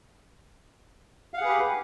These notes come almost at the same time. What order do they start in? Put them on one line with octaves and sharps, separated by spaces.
F5 F#5 G#4 B4 G4